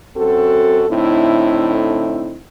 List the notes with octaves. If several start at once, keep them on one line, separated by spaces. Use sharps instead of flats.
F#2 C4 F#4 A4
A2 D3 C4 D#4 E4